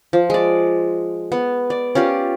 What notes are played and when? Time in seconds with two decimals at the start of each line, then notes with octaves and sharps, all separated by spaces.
0.13 F3
0.30 G#3 D5
1.32 B3
1.70 D5
1.95 C#4 F4 G4 D5